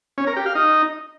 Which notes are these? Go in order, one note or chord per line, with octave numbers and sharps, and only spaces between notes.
C#4
A#4
G4
F5
D#4